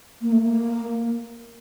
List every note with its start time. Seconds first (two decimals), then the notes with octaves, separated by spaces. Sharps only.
0.22 A#3
0.32 A3
0.42 A#3